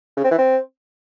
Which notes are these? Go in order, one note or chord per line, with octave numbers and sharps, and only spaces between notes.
C#3
C4
E3
C4